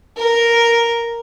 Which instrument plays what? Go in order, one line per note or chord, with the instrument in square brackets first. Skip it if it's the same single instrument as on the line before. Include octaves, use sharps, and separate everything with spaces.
[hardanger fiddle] A#4